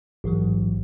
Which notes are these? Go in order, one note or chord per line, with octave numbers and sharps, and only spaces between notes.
A1 G#2 E3 F#3